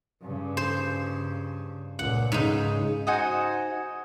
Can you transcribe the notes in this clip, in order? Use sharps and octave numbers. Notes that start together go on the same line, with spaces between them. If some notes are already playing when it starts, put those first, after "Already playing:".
G2 C#3
C5
C#2 A#2 F#5
G#2 C#3 D#4
D#4 F#4 C5 G#5